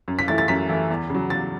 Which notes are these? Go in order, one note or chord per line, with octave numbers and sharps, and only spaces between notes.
F#2
B6
E3 A3 E4 A6
A6
F#2 B6
E3 A3 E4
E2
C#3 F#3
E2 A6